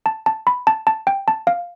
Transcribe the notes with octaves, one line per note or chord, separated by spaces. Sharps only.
A5
A5
B5
A5
A5
G5
A5
F5